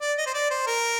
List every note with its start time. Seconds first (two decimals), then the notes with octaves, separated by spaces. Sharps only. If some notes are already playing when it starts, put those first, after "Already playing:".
0.01 D5
0.18 D#5
0.26 C5
0.34 D5
0.51 C5
0.67 A#4